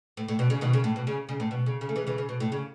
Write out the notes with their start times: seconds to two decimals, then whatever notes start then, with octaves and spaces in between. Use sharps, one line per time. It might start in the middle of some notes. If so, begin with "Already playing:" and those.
0.17 A2
0.28 A2
0.39 B2
0.50 C#3
0.61 B2 D#3
0.73 C#3
0.84 A2
0.96 B2
1.07 C#3
1.29 C#3
1.40 A2
1.51 B2
1.66 C#3
1.81 C#3
1.89 A3
1.96 E3 G#3
2.07 C#3 E3
2.18 C#3
2.29 B2
2.40 A2
2.52 C#3